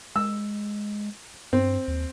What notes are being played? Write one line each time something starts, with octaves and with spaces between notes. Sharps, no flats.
G#3 E6
G2 C4
D#2